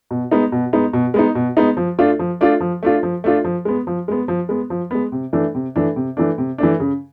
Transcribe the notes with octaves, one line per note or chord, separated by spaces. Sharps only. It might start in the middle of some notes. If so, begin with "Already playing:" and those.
B2
G#3 B3 D#4
B2
G#3 B3 D#4
B2
G#3 B3 D#4
B2
G#3 B3 D#4
F3
A3 D4 F4
F3
A3 D4 F4
F3
A3 D4 F4
F3
A3 D4 F4
F3
G#3 B3
F3
G#3 B3
F3
G#3 B3
F3
G#3 B3
C3
E3 A3 D4
C3
E3 A3 D4
C3
E3 A3 D4
C3
E3 A3 D4
C#3